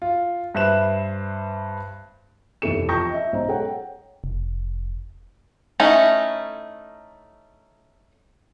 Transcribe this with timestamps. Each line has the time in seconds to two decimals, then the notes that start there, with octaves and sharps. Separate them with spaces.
0.02 F4
0.54 G2 B4 C5 E5 F#6 E7
2.62 F1 B1 E3 A4 C#7 E7
2.88 F3 G5 A5 C#6 G6 A#6
3.10 D#5 E5
3.32 B1 G#2 C5 D#5 A#5
3.48 G#4 A4 C#5 F#5 G5
4.24 F1
5.80 A3 C#4 D#4 E4